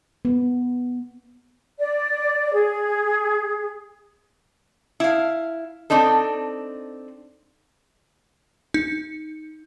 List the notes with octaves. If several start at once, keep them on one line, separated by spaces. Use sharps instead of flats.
B3
D5
G#4
E4 F5
C4 D4 D#4 A4
D#4